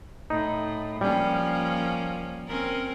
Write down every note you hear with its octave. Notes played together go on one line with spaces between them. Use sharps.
A2 D#4
F3 G3 A#3 C#4
C4 C#4 A#4